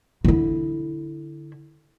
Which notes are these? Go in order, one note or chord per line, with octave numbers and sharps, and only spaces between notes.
D3 E4